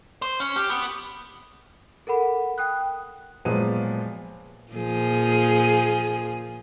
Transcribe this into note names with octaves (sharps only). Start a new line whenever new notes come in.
C5
C#4
G4
B3
A4 A#4 F#5 B5
G5 D#6 F#6
A#2 F3 F#3 G#3 B3 D#7
A#2 F3 G#4